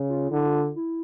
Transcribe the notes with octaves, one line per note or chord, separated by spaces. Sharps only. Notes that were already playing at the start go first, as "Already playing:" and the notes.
Already playing: C#3
F4
D3 E4
F4
E4